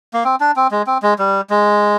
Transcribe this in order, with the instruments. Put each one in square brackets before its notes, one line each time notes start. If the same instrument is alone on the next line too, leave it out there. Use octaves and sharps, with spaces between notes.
[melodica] A#3
C4
D4
C4
G#3
C4
G#3
G3
G#3